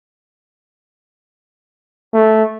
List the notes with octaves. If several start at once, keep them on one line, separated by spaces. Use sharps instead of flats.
A3